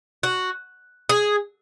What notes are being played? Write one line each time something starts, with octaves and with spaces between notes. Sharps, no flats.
F#4
G#4